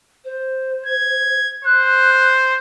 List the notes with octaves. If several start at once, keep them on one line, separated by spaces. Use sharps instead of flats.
C5
G#6
C5 F#6